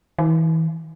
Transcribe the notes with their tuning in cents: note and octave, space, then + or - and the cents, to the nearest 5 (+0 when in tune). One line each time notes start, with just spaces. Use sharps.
E3 -35